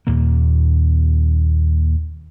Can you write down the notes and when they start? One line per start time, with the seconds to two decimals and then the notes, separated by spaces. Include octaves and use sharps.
0.07 D#2 A#2 A#3